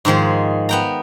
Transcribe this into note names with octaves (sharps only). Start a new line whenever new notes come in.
G#2 D#3 F3 G#4
B3 G5 A#5